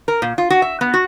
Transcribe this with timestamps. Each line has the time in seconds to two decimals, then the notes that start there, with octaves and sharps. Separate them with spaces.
0.08 A#4
0.22 A#2
0.38 F4
0.50 F#4
0.62 E5
0.81 B3
0.94 F#4